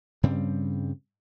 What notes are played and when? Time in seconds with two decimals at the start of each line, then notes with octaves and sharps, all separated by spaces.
0.23 G2 C#3 G3 C4